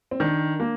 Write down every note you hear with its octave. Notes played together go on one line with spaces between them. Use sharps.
C4
D#3 D4
A#3